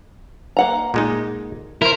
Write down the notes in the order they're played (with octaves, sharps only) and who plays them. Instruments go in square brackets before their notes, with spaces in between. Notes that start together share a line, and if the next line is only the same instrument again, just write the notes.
[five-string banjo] A#3 F#5 A#5
[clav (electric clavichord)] A#2 G#3 D#4
[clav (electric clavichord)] E4 C5 [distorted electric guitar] A#4